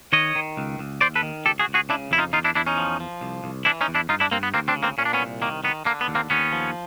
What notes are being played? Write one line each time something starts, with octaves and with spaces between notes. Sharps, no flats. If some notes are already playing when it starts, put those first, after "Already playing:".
D#3 C#5 D#5
D#3
C#2
C#2
D#2 C5 D5
A4 B4
D#3
C#2 G4 A4
F#4 G#4
C#2
F#4 G#4
C#3 D4 E4
F2 E4
D#4 F4
E2 D#4 F4
D4 E4
E2 D4 E4
C#4 D#4
F3
F3
C2
C2
E3 D4 E4
C#4 D#4
E2
D4 E4
G2 D#4 F4
D4 E4
G2 A#3 C4
B3
D2 A#3 C4
C4 D4
C#3
A#3 C4
A#2 C#4
D4
B3 C#4
C2
D#3 A#3
D#3 B3
D3 A#3
B3
D#2
A#3 C4
D#2 B3 C#4
F3